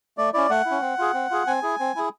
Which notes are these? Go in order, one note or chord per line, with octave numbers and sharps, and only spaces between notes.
A3 D5
C#4 E4 D5
A3 F#5
E4
C#4
C4
F4 G#4
C4
F4 G#4
C4 G#5
E4 G#4
C4
E4 G#4